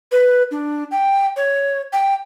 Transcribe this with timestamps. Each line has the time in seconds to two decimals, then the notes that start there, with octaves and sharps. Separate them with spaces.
0.12 B4
0.51 D4
0.91 G5
1.37 C#5
1.93 G5